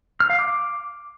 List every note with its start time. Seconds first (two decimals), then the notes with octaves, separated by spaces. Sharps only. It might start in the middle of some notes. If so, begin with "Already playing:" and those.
0.20 F6
0.30 F5
0.39 D6